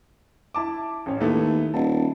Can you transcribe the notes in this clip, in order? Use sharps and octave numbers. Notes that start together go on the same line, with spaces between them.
E4 A5 D6
A1 C#4
D#2 A3 B3 E4
D#1 A5